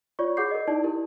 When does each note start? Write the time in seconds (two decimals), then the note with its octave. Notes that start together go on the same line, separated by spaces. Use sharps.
0.19 F4 C#5 D5 C#6
0.37 F#4 G#4 F#5 D6 G6 C7
0.51 A#4 D#5
0.68 D#4 E4 D5 A5
0.84 E4 G4 A#4